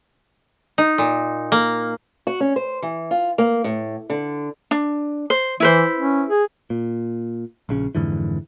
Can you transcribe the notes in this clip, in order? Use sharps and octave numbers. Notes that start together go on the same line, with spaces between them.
D#4
A#2
A#3
F#4
C#4
C5
E3
F4
A#3
A2
D3
D4
C5
E3 E4 B4 C5
C#4
G#4
A#2
A#1 C#3 C#4
F2 G#2 D3 E3